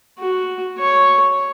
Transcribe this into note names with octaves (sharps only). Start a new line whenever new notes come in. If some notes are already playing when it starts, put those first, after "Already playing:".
F#4
C#5